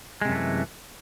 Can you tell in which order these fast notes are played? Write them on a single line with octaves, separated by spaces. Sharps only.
G#3 C3 F#2 A3 E3